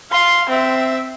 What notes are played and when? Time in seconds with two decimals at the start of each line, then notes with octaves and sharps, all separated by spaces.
0.11 F5 C6
0.49 C4 E5